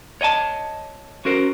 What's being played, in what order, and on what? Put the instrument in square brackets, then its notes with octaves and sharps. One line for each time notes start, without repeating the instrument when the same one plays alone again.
[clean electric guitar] C#5 D#5 G5 A5
C#4 F#4 A#4 C5